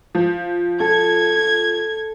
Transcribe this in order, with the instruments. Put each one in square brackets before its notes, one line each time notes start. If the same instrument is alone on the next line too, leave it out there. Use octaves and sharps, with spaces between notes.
[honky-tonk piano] F3
[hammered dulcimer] A4 [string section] G#6